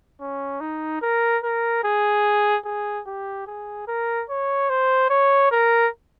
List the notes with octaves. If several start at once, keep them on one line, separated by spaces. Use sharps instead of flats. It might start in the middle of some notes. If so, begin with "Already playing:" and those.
C#4
D#4
A#4
A#4
G#4
G#4
G4
G#4
A#4
C#5
C5
C#5
A#4